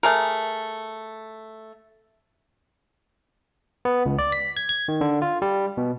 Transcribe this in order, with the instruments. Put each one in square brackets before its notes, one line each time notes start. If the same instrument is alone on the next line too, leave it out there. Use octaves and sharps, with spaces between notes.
[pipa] A3 G#4 A#4
[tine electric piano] B3
C#2
D5
B6
G#6
G#6
D#3
D3
F4
G3
B2